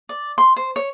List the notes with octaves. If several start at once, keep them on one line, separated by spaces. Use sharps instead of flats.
D5
C6
C5
C#5